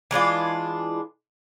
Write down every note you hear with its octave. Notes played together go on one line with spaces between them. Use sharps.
E3 G#3 D4 F4